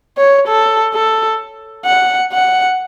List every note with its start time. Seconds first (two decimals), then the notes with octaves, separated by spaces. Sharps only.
0.17 C#5
0.48 A4
0.94 A4
1.85 F#5
2.32 F#5